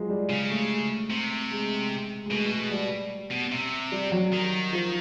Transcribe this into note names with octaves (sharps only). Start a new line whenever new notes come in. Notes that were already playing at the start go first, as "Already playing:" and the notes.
Already playing: F3 F#3 G#3
G3
C#3 G#3
A3
C3
G#3
G#3
B2 A3
G#3
G3
B2
C3
G3
F#3
D#3
F3